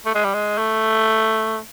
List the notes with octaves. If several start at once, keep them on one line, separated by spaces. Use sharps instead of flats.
A3
G#3
G3
G#3
A3